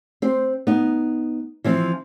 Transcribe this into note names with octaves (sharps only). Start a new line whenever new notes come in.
C4 C5
B3 D#4
E3 F3 C4